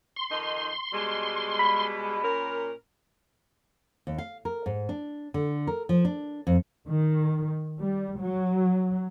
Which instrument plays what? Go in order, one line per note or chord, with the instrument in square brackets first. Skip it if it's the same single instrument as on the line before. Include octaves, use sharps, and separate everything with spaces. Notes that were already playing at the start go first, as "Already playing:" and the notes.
[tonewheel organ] C6
[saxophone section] F2 D#3 D#4
B2 G3 G#3
[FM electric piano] B5
[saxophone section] A#2 C#4 A#4
[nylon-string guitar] D#2
F5
A#4
G#2
D4
D3
A#4
F3
D4
F2
[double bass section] D#3
G3
F#3